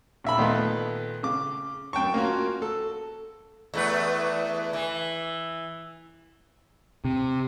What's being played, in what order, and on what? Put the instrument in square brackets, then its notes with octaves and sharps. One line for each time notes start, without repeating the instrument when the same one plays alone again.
[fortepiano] A#1 E5 B5
A#2 D#3 A3 B3
C#3 D6
F#2 G5 A5 C#6
A#3 C#4 F4 F#4
A4
[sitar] E2 A3 B4
E3
[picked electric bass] C3